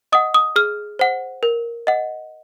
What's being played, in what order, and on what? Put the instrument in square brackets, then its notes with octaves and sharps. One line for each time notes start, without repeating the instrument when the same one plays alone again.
[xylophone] D#5 F#5 D#6
D#6
G#4 F6
C5 F#5
A#4
D#5 F#5